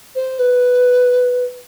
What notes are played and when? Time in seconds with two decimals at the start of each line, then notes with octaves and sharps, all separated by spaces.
0.15 C5
0.39 B4